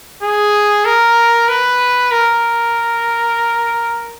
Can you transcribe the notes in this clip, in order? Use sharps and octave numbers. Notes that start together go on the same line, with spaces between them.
G#4
A#4
B4
A#4